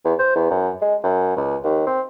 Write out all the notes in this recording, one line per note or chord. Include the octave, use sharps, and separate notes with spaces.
E2
C5
E2
F#2
G#3
F#2
C#2
D#2
C4